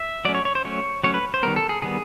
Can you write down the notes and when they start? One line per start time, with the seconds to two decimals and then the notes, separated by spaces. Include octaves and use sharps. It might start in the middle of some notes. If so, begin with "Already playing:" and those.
Already playing: E5
0.25 F#3 A3 C#4 D5
0.35 C#5
0.45 C#5
0.55 C5
0.65 F#3 A3 C#4 C#5
1.03 F#3 A3 C#4 C#5
1.14 B4
1.34 C5
1.43 D#3 G3 B3 A#4
1.56 A4
1.69 G#4
1.82 D#3 G3 B3 G#4